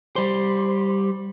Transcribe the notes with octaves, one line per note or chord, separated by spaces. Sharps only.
G3 C5